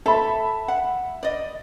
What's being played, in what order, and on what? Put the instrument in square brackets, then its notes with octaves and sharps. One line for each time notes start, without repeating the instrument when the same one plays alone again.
[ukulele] A4 [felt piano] E5 B5
[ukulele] F#5
D5 D#5